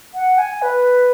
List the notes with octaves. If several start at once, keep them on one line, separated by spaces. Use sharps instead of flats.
F#5
G#5
B4